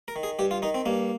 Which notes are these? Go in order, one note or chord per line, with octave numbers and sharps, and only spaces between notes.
A#4
D#3
G#4
G2 G4
F4
D#3 D#4
C4
G2 A#3